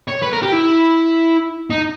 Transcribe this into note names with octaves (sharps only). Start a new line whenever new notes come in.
C#5
B4
A#4
G4
E4
D#4